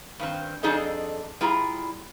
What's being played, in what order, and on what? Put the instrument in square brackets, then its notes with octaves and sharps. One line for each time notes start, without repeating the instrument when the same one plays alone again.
[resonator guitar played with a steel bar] G2 D#3 C4
F2 D4 D#4 G#4 A4 D#5
G3 E4 F4 G#4 A#5